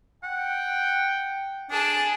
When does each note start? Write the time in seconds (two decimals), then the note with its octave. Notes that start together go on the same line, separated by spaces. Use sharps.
0.23 F#5 G5
1.71 D4 G#4 A5